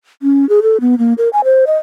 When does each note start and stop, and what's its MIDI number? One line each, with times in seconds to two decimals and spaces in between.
0.22 0.47 61
0.49 0.60 68
0.62 0.80 69
0.81 0.98 59
0.98 1.14 58
1.18 1.29 70
1.33 1.41 80
1.44 1.65 72
1.67 1.77 75